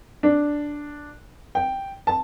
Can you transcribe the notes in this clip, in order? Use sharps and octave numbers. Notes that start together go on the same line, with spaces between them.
D4
G5
A5